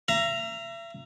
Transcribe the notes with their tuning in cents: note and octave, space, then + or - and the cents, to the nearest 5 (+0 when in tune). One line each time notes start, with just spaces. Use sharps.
E5 +40 A#5 +0